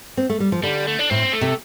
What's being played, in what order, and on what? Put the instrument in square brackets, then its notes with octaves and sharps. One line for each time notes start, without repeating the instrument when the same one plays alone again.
[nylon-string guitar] C4
A3
G3
F3
[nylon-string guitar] D3 [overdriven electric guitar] G3
[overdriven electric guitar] A3
D4
[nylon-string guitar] A2 [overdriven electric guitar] C4
[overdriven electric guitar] A3
[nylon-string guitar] C3